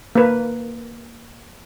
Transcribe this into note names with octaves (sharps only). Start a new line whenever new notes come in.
A#3 B4